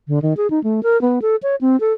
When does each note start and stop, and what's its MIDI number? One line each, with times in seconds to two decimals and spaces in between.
0.08 0.22 50
0.22 0.34 51
0.37 0.50 68
0.50 0.62 63
0.64 0.83 57
0.83 1.00 70
1.01 1.19 59
1.22 1.36 69
1.43 1.55 73
1.61 1.79 60
1.80 1.93 69